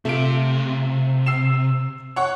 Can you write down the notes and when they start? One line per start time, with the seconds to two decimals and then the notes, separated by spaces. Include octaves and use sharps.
0.05 C3 A3 F4 D7
1.26 E6 C7 E7
2.16 C#5 F#5 C#6